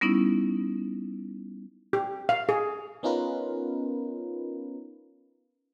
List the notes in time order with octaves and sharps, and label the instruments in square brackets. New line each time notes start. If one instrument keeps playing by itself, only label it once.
[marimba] G3 B3 C#4 D#4 E4
[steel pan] G4
F5
G#4
[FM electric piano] B3 C#4 D#4 F4 A#4 B4